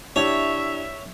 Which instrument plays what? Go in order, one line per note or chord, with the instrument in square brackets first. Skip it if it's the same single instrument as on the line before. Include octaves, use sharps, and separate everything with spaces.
[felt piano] D4 E4 G4 [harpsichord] C#5 [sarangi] E5